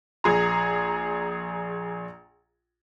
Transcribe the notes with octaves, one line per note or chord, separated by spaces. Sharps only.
A#1 G#4 A#5